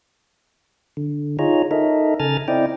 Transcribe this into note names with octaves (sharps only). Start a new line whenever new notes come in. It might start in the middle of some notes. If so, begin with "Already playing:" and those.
D3
D#4 F4 G#4 C#5 A#5
D#4 A4 A#4 D#5 E5
C#3 A4 G#5 A#5 F6 A6
C4 E4 D5 D#5 G5